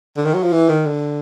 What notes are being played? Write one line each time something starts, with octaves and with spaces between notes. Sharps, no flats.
D3
D#3
F#3
F3
E3
D#3
D3